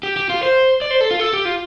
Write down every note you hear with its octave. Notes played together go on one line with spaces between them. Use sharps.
G4
G4
F4
C5
D5
C5
A4
F4
A4
G4
F4